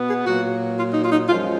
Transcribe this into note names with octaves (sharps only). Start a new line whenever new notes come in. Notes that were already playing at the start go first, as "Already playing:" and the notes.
Already playing: B2 B3
G#4
A#2 F#3 A#3 F#4
F4
D#4
F4
D#4
F#2 F3 G#3 F4